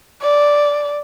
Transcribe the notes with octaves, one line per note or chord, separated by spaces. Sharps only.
D5